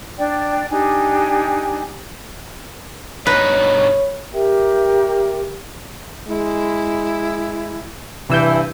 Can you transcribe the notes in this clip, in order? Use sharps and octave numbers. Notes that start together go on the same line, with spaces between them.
D4 D5 G5
D4 D#4 G4 G#5
G2 B2 D#4 B4 C#5
G4 A#4 E5 G5
G#3 E4
G2 C3 E3 E6 G6